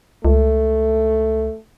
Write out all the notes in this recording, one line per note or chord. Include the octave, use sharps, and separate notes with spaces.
C#2 A3